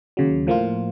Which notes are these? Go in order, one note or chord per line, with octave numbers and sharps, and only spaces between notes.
D#2 C#3 F#3
A2 F3 A#3 F4